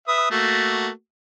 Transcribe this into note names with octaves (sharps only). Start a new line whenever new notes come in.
B4 E5 D#6
A3 A#3 F#4